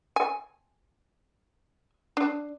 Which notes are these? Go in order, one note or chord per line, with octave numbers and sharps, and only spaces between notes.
G#5
D4